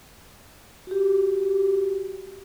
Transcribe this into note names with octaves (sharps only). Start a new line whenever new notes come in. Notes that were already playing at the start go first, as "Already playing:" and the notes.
F#4 G4